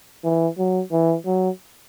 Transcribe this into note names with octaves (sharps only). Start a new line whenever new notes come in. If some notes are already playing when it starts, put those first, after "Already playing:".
E3
F#3
E3
F#3